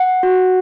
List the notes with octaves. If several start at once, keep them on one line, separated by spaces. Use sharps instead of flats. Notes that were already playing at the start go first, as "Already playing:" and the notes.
Already playing: F#5
F#4